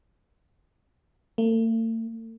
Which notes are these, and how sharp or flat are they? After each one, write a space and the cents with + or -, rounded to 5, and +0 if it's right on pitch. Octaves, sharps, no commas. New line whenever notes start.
A3 +45